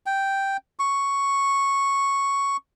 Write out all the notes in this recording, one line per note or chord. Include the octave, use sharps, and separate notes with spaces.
G5
C#6